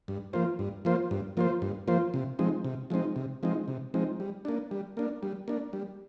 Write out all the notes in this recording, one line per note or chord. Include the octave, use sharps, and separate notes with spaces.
G2
F3 A#3 F4 C5
G2
F3 A#3 F4 C5
G2
F3 A#3 F4 C5
G2
F3 A#3 F4 C5
C3
F3 G#3 C4 D#4
C3
F3 G#3 C4 D#4
C3
F3 G#3 C4 D#4
C3
F3 G#3 C4 D#4
G3
A#3 D4
G3
A#3 D4
G3
A#3 D4
G3